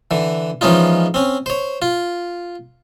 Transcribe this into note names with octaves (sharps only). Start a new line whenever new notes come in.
D3 E3
E3 F3 G#3 C#4 D#4 F4
C4 C#4
C5 C#5
F4